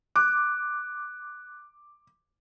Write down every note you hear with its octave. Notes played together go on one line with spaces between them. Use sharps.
D6 F#6